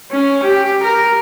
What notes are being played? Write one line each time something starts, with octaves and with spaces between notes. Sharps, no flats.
C#4
G4
A#4